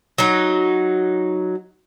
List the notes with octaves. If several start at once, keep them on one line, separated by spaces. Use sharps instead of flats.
F#3 D#4